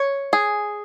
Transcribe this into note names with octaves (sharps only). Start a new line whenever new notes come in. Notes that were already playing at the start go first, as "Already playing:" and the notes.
Already playing: C#5
G#4